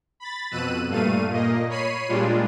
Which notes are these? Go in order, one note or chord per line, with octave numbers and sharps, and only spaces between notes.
B5 A6
F2 B2 E6 F#6 D#7
G2 A#2 A3 F5 D#7
A#2 A#3 D#5
C#5 B5 C7 D#7
A#2 G3 G#3 D4 F4